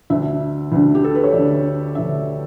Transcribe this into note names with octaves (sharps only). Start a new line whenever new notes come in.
D2 D3 E5
D2 D3
G4
A4
B4
C#5
D2 D5
D3
D2 D3 E5